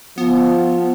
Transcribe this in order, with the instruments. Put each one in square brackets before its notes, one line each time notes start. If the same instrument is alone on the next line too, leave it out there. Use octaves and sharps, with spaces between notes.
[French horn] F3 [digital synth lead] B3